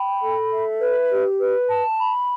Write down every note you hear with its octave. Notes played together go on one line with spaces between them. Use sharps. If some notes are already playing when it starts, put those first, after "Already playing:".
Already playing: G5 B5
A4
E5
B4
G4
B4
A5
B5